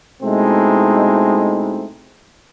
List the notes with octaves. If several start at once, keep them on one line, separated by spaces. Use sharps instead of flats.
B2 G#3 A3 C4 D#4 E4